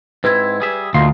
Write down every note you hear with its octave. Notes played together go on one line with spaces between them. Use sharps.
G#2 C4 E4 B4 G#6
G3 G#4 E5
D2 A#2 D#4 F5 C6